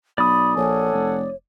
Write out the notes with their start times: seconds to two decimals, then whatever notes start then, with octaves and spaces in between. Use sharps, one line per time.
0.18 B1 D5 B5 D#6
0.57 A#1 A4 C#5 F#5 G#5
0.93 F1